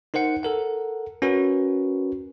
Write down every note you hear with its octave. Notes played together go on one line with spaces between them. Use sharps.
D#4 A#4 C5 F#5 C#7
A4 A#4 F#5
C#4 F#4 A#4 B4